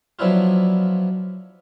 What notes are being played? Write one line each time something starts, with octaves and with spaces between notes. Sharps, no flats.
F3 F#3 B3 D4 E4 F4